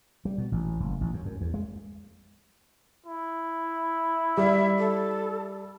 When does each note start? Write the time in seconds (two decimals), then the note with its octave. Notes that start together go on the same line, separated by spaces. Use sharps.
0.25 G3
0.38 B2
0.52 A1
0.80 F#1
1.01 A1
1.14 F#2
1.25 F#2
1.41 E2
1.54 G#3
3.06 E4
4.37 G3 E5
4.79 A4